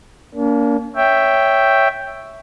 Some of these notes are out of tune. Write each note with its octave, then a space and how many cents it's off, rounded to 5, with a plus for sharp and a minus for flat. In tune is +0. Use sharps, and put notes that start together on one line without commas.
A#3 +0 D4 -45
C#5 +0 E5 +0 G5 +0